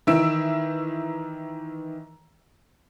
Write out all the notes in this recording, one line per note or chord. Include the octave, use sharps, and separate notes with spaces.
D#3 E3 E5 E6 D7